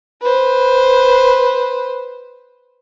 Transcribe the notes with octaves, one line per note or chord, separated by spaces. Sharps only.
B4 C5